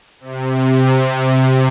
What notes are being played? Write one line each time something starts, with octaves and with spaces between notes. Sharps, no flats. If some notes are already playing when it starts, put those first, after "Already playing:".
C3